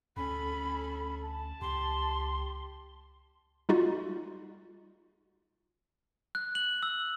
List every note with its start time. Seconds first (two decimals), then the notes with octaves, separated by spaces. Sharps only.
0.17 D2 C#4 A4 B5
1.24 A5
1.62 C#2 G4 C6
3.69 G3 D#4 F4 F#4
6.35 F#6
6.55 F#7
6.83 E6